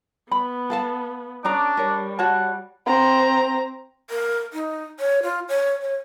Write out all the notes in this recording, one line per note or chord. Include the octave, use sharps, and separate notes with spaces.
B3 B5
A4 F5 A5
C#4 D4 G#4 A#5 D6
G3 A#4 C#5
F#4 C#5 F#5 A5
C4 A#5
A#4
D#4
C#5
F4
C#5
C#5